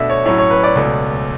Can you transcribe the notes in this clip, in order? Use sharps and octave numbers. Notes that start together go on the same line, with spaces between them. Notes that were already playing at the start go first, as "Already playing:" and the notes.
Already playing: B2 A3 D4 E5
C#5
A2 F#3 C#4 C#5
C#5
B4
D5
C#2 B2 A3 C#4